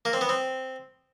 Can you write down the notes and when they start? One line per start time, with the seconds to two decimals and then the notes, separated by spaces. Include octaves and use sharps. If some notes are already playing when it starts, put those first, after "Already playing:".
0.05 A#3
0.13 C4
0.21 B3
0.29 C4